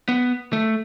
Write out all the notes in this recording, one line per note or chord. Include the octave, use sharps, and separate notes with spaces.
B3
A3